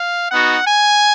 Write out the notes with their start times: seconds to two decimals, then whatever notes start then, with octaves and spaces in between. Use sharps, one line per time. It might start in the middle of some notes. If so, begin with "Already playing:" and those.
Already playing: F5
0.31 B3 D#4 F#4 F#5
0.67 G#5